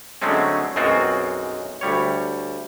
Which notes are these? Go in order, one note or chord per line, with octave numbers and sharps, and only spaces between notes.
D3 F#3 G#3 A3 C4 C#4
B1 F#2 G#3 C4 F4 F#4
D2 G3 C#5